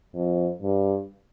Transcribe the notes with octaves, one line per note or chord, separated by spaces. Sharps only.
F2
G2